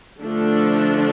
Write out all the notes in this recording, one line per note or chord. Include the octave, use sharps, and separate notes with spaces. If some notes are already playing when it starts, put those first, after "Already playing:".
D3 F3 A3 D4 A4